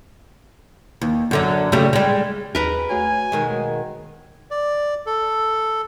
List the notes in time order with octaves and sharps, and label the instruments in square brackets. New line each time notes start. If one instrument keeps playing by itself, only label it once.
[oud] D#2
F#2 D3 F#3
C#3 G3 A3
G3 G#3
[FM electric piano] D#2 D#4 G#4 [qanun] A#4 B4 A#5
[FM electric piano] A3 F#4 C#5 [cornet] G#5
[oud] B2 D#3 G#3
[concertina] D5
A4